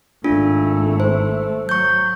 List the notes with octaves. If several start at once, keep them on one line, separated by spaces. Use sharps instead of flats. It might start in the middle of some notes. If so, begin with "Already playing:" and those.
G#1 A3 D4 F4
C5
F#3 C#6 G6